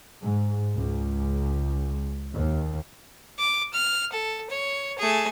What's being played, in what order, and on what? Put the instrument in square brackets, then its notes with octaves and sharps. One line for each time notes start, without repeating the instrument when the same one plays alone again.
[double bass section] G#2
C#2
D#2
[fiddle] D6
F6
A4
C#5
A3 G#4